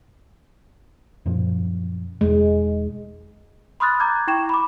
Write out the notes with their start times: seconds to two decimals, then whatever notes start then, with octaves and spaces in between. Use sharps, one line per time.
1.26 F#2 A#2 F3
2.21 E1 G#3
3.80 B5 C6 D#6 F6 F#6 A6
4.00 A#5 D6 G6 G#6
4.27 E4 G5 C#6 E7
4.49 B5 D6